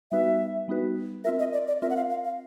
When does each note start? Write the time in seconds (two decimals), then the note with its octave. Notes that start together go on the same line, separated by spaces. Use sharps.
0.11 G3 B3 D#4 F#4 B4 E5
0.68 G3 B3 D#4 F#4 B4
1.24 C4 F4 A#4 E5
1.39 D#5
1.53 D5
1.68 D5
1.82 C4 F4 A#4 E5
1.90 F#5
1.96 F5
2.10 F5
2.24 F5